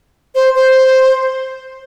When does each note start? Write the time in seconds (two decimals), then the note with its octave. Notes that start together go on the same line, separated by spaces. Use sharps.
0.35 C5
0.55 C5